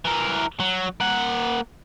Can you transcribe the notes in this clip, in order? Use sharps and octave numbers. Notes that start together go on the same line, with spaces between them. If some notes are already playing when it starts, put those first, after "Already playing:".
E3 A#4
F#3
A#3 F#5